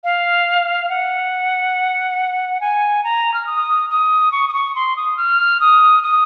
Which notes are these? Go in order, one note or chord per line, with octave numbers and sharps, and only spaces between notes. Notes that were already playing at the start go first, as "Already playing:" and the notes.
F5
F#5
G#5
A#5
F6
D#6
D#6
C#6
D#6
C#6
C6
D#6
F6
D#6
D#6